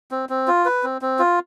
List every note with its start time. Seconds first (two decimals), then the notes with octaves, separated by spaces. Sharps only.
0.11 C4
0.29 C4
0.47 F4
0.65 B4
0.83 C4
1.02 C4
1.19 F4